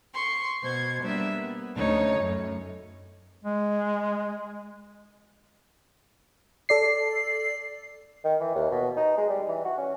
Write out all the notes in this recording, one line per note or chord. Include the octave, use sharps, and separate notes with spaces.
C6 C#6
B2 C5 G#6
G3 A#3 B3 D4 E5
B3
D2 C#4 D#4 C#5
F#2 A2
G#3
A4 D5 C7
D#3
E3
D#2
B2
D#4
G#3
G3
E3
F#4
C#4